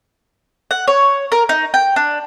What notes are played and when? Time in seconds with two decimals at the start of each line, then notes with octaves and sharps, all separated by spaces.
0.71 F#5
0.88 C#5
1.32 A#4
1.49 D#4
1.74 G5
1.96 D4